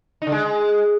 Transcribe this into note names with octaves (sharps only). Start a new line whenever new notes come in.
D#4
D3
G#3